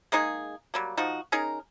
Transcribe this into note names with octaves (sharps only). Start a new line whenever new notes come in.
G#3 A#3 D#4 G#4
F#3 G3 A#3
F3 D#4 F#4
C#4 D#4 G#4 A#4